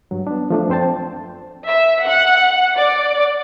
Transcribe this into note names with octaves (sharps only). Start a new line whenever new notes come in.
G2 F#3
B3 D4
F3 A3 D4
F#2 C4 C5 G5 A5
E5
F#5
D5